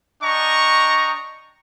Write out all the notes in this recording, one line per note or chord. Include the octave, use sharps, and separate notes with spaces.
D4 D#5 G5 A#5 C#6